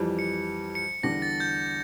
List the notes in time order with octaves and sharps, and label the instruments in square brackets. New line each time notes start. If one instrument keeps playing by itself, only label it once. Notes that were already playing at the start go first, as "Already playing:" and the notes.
Already playing: [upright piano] F2 E3 G3
[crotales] C#7
C#7
[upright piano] E2 D3 G3 D4 G4 [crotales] A#6
[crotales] A6
G6